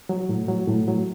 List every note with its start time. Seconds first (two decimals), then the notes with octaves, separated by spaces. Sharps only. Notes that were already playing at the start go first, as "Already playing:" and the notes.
0.09 F#3
0.29 A2
0.48 F#3
0.67 A2
0.88 F#3